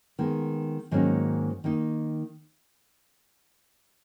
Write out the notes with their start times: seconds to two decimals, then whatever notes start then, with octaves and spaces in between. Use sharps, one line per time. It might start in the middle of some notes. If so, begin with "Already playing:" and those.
0.19 D#3 G#3 B3
0.91 G#2 D#3 F#3 A#3 C#4
1.64 D#3 A#3 D#4